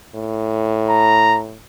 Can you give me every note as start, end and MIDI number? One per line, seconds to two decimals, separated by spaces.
0.15 1.59 45
0.89 1.38 82